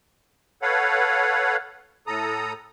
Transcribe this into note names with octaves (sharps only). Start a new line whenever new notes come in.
A4 B4 C#5 F5 F#5
A2 A4 A#5 D#6